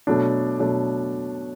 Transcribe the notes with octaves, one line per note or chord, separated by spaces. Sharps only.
B2 F#3 A3 D4
B2 F#3 A3 D4